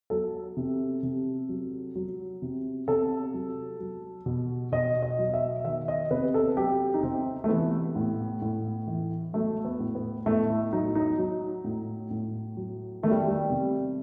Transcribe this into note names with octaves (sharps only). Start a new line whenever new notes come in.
F#3 A4
C3
C3
F#3
F#3
C3
C3 A4
F#3
F#3
B2
B2 D#5
D#5
F#3
E5
D#3 E5
D#5
C3 B4
A4
F#3 G4
D#4
C3 C4
A3
E3 B3
A2
A2
E3
F#3 A3
B3
A2
B3
A2 A3
E4
F#3 D#4
D#4
F#3
A2
A2
F#3
D#3 A3
G3
G3
C3